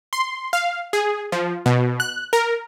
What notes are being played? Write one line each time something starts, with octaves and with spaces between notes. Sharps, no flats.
C6
F5
G#4
F3
B2
F#6
A#4